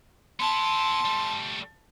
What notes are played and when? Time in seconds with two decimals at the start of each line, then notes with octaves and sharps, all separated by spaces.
0.40 B3 E4 A5 C6
1.04 G3 A3